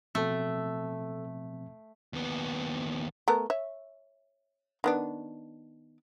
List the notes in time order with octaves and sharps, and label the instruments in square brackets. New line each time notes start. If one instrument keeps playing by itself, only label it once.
[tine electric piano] B2 F3 C4 [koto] A3 [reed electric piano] A4 E6
[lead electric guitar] D#2 B3
[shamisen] A3 B3 A#4
C#5 E5
D#3 B3 D4